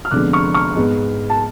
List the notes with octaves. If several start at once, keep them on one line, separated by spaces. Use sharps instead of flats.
F6
F1 F2 D3 G#3 B3 D6 F#6
C#6 F6
C#6 F6
G#2 G#3 B3
A5